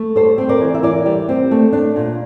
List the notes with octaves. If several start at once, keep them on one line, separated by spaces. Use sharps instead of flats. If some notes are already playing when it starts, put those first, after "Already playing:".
Already playing: A3
G3 A4 C5
C4
A#4 D5
E3
E5
E3 A#4 D5
G3
C4
A3
D4
A#2